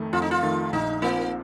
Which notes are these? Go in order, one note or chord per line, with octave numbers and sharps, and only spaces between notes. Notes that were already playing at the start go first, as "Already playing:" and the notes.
Already playing: F2 D#3 A3
F2 F4
D#4
F4
D#3 A3
A#1 D#4
A#2 F3 A#3 C4